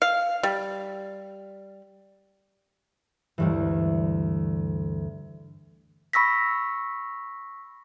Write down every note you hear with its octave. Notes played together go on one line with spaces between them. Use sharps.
F5
G3
D2 G2 E3
B5 C#6 E6 A#6 B6